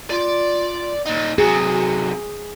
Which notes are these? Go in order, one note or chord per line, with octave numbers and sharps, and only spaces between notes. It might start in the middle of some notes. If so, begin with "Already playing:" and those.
F4 D5
A#2 D#4
C3 F#3 F#4 G#4